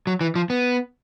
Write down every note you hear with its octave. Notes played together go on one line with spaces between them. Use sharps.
F#3
E3
F3
B3